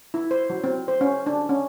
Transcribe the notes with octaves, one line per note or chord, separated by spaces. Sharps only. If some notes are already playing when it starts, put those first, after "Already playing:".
E4
C5
F#3
C4
C5
C#4
D4
C#4